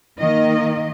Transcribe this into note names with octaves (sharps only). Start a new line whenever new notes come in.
D#3 A#3 D#5